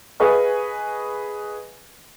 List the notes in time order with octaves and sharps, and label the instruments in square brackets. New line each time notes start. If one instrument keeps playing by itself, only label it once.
[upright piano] G#4 B4 D#5 F5 G#5 C#6